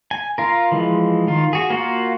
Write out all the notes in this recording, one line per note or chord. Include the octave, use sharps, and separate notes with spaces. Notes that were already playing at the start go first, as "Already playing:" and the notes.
G#5
F4 A#4
E3 F3 G#3
D#3 F4
F#4 G#4
A#3 F4 F#4